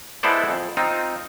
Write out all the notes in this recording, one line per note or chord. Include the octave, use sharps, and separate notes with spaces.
G#3 B3 E4 A4 C5 D5
F2
C4 D#4 F4